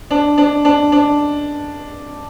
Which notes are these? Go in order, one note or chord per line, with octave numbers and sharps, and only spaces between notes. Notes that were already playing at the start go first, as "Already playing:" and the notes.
D4
D4
D4
D4